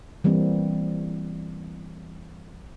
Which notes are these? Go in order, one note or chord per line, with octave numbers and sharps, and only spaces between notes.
E3 G3 A#3 C4